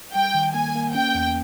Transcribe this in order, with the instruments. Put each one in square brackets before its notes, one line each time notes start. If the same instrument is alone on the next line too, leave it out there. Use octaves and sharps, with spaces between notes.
[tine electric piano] G3 [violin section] G5
[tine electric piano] D#3
[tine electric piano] A#3 [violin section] G#5
[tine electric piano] A#3
[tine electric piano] C#4 [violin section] G5
[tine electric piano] E2